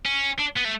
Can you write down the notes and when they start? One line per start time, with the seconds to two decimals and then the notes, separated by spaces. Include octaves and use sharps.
0.05 C#4
0.39 D4
0.56 B3
0.64 A3